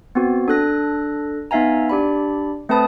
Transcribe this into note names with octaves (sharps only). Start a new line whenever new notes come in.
B3 C4 F#4
D4 A4 F#6 A#6
B3 D#4 E5 F5 G#5 A#5
D4 G4 D5 B5
A3 C4 B4 A5 B5 D#6